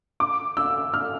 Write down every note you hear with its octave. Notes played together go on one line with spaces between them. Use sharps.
D6
E6
F6